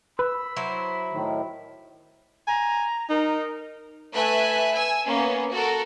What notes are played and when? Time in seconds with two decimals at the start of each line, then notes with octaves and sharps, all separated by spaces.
0.19 B4 B5 E6
0.57 F#3 E4 C5
1.12 A2 D#3
2.48 G#5 A#5
3.10 D#4 A#4
4.13 A3 B4 E5 G#5 F#6
4.73 G#5 E6
5.04 A#3 B3 C#4
5.51 F#4 A4 A#4